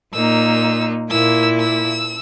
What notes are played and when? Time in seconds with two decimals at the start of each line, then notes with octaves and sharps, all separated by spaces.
0.15 A#2 A#3 D#4 E6
1.11 A#2 A#3 E4 E6
1.59 E6